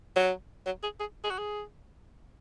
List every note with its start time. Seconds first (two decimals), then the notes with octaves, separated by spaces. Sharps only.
0.16 F#3
0.66 F#3
0.83 G#4
1.00 G#4
1.24 G#4
1.30 F#4
1.38 G#4